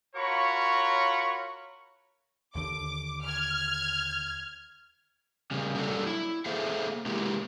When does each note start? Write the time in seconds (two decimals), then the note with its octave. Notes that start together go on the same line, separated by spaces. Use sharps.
0.15 F4 F#4 A#4 C#5 B5 C#6
2.55 D#2 D3 D6
3.24 F6 G#6
5.51 C#3 G3 C#4
5.74 F#3 G3 A#3 D4 F4 A4
6.06 E4
6.46 A#3 G#4 A4 C5 E5 F5
7.06 G#3 A#3 E4 G4 A#4